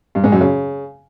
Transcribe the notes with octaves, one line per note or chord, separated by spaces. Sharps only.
G2
G#2
F#2
C#3